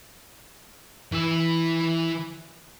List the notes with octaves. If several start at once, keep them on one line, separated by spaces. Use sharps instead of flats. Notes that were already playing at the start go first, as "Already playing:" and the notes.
E3 E5